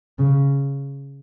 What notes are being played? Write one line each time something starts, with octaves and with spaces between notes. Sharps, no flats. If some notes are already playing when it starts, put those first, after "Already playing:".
C#3